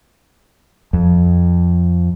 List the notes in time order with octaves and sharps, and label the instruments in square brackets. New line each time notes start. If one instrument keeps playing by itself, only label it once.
[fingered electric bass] F2